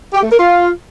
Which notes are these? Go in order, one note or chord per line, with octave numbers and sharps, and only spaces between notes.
G4
A3
A#4
F4